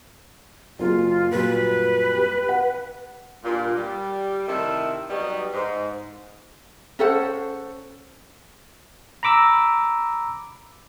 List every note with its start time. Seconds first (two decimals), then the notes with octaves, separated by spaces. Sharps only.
0.79 F#1 A#3 F4 G#4
1.31 F#2 A#2 G3 B4
2.15 G4
2.49 F#5
3.44 G2 A#2
3.76 G3
4.47 C3 D#3 A3 E4 A4
5.10 F#3 G3 B3 D#4
5.52 G#2
6.99 C#4 A4 C5 F#5
9.23 A#5 B5 D6 E6